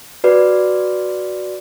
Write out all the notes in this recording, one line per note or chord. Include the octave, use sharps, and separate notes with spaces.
F#4 B4 D5